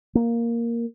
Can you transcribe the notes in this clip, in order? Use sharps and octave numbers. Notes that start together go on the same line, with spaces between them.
A#3